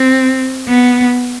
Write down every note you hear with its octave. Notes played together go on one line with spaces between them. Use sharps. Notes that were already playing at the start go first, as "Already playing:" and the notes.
Already playing: C4
B3